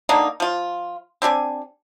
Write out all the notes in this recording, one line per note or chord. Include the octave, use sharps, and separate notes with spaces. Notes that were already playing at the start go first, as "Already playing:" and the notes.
D3 A#3 D4 D#4
F3 F4
C4 D4 G4 G#5